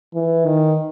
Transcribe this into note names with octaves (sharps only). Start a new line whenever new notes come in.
E3
D#3